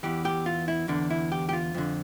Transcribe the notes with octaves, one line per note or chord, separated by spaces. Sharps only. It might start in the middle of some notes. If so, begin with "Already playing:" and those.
E2 E3 G4
G4
F4
E4
E2 D3 D4
E4
G4
G4
F4
F2 D3